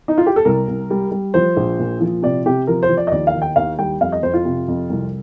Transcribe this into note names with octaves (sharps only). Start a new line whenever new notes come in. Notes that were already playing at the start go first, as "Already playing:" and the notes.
D#4
F4
G4
A4
C2 A#4
C2
G3
G3
F3 C5
A#1
A#2
F3
C3 D5
C3 G4
F3 A#4
C5
F3
D5
D#5
D#2 D5
F5
D#3
G5
D#2 F5
G3 G5
F2 F5
D#5
F2 C5
F4
C3
F2
C2